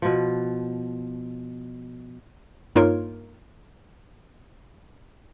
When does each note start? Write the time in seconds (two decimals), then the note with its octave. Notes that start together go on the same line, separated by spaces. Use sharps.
0.02 B2 F3
2.76 G2 A#3 D#4 F4 A#4 C#5